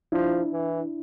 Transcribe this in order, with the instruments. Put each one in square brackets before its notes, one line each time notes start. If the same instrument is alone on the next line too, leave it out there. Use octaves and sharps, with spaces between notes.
[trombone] F3 [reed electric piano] D4 E4
[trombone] E3